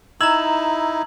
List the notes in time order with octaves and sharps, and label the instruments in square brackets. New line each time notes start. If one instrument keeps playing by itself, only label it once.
[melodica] D#4 E4 [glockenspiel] A#5 F#7 [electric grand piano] E6 G#6